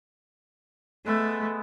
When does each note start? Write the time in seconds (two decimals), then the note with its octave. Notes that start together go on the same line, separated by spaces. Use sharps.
1.06 G#3 A3 B3 E5